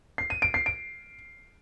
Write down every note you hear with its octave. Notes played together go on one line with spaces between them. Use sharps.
C7
D#7
D7
C7
D7